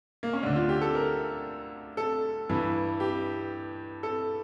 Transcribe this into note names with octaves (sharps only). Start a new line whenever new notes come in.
A#3
C#4
D2 D3 D4
F4
G4
A4
A#4
A4
G2 E3
G4
A4